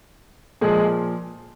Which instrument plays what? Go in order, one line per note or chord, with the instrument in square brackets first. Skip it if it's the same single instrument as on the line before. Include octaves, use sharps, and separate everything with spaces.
[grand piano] A#2 F3 G#3 G#4